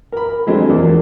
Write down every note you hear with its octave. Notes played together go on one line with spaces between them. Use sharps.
A#4 B5
F3 F#3 G#3 A3 C4 D4
E2 A#3 D4